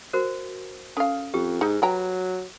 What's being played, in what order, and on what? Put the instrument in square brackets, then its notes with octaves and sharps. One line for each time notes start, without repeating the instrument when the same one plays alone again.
[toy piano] F#4 A#4 C5
[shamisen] C#4 F5 [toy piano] A4
[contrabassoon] F2 [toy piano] G4
[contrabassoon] G#2 [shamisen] D#4
[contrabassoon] F#3 [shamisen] B4 G5 A#5